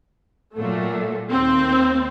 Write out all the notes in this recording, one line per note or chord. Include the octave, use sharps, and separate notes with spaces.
A#2 F#3 A3
D#2 C4